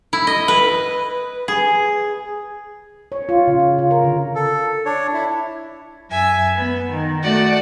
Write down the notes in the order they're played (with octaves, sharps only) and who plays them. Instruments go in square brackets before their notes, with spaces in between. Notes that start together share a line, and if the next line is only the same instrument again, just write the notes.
[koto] E4
D#5
B4
G#4
[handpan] C#5
F4
C#3
F4
F4
A#4
D3
[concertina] A4
D4 C#5
E4
[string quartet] F#2 E5 G#5
B3
D#3
A3 F#4 D5 F#5